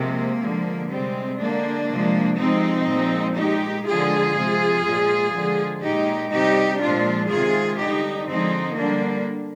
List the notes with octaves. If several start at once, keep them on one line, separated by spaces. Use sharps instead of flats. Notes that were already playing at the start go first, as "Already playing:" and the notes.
Already playing: C3 F3 G#3 A#3
D3 F3 G#3
C3 G3 G#3 C4
D3 G#3 A#3 D4
C3 F3 G#3
C3 F3 G#3 C4 D#4
A#2 F3 G#3
A#2 G#3 D#4 G4
D3 F3 G#3 F4 G#4
C3 F3 G#3
A#2 F3 G#3
D3 F3 G#3
A#2 G#3 D#4 G4
C3 G3 D#4 G4
A#2 F3 G#3 D4 F4
C3 D#3 G#3 F4 G#4
D3 G3 D#4 G4
D3 F3 G#3 C4 D#4
D3 G3 A#3 D4